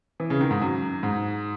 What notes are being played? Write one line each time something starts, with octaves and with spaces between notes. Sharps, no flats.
E3
C#3
D#3
G#2
F#2
G#2